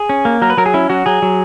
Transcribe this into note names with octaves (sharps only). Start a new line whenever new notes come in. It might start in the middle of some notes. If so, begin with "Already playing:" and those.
Already playing: G#4
C#4
A#3
F#3 A#4
B4
F#3 A#4
G#4
C#4 E4
F#3 F#4
F#3 G#4
F#3